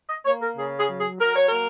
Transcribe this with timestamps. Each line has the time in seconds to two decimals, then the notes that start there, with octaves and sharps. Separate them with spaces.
0.09 D#5
0.25 A#3 C#5
0.41 A#4
0.56 C#3 G#4
0.78 G#4
0.88 F#3
0.99 G#4
1.20 F#3 A#4
1.35 C#5
1.47 A#3 A#4